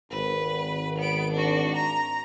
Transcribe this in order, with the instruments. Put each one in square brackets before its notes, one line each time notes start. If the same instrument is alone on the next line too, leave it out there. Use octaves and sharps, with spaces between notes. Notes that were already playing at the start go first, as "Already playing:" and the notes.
[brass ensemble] G#1 [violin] B4
[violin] B3 D7
D4 F#4
A#5